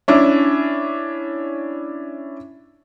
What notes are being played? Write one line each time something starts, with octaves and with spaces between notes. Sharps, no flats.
C#4 D4 E4